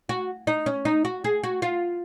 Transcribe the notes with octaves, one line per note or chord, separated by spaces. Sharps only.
F#4
D#4
C#4
D#4
F#4
G#4
F#4
F4